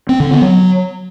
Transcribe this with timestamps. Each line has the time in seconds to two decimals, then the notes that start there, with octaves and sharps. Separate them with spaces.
0.09 C4
0.20 D3
0.31 B3
0.42 F#3